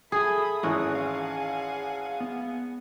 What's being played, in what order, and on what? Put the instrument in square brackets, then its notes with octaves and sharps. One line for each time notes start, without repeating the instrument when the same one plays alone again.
[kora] G#4 [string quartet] A4 E5 B5 [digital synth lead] D#6
[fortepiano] G#1 E3 F#6 [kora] C#4 [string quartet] G#4 F#5 G#5
[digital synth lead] F5
B3